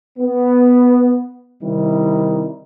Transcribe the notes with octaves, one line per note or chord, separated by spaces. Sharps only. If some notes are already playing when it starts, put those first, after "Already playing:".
B3
C3 D#3 G3 D#4 E4